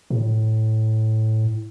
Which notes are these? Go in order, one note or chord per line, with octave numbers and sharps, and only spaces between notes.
A2